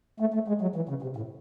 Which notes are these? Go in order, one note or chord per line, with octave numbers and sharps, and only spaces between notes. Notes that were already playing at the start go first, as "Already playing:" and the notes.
A3
A3
G#3
F#3
E3
C#3
C3
A2